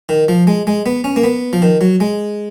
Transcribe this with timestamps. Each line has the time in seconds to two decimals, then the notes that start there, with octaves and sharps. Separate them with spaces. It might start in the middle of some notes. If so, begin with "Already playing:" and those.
0.09 D#3
0.28 F3
0.47 G#3
0.67 G#3
0.86 B3
1.04 C#4
1.16 A#3
1.24 B3
1.53 F3
1.62 D#3
1.81 F#3
2.00 G#3